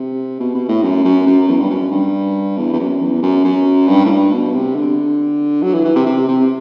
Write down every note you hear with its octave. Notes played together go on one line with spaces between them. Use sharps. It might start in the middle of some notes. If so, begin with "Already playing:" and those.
Already playing: C3
B2
B2
A2
F#2
F#2
F#2
E2
G2
F#2
G2
E2
E2
F#2
E2
F#2
F#2
G2
A2
G2
B2
C3
D3
F#3
E3
E3
C3
C3
C3